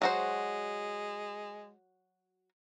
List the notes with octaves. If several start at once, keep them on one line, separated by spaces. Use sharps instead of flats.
F#3 G#3 F#4 C5